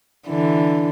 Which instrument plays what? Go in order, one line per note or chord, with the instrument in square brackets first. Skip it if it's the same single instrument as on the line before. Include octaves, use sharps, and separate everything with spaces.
[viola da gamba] D3 E3